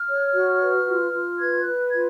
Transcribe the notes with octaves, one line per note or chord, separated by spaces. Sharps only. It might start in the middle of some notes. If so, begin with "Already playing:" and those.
Already playing: F6
C#5
F#4
B4
F4
F4
B4 G#6
F#6
B4
F4 G#6